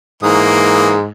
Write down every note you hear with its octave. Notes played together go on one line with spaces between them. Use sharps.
G#2 E3 A#3 D#6